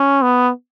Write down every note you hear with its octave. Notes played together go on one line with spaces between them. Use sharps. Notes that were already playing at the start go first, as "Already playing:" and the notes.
Already playing: C#4
B3